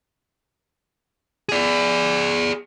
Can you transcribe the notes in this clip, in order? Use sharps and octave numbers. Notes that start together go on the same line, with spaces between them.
G#4 D5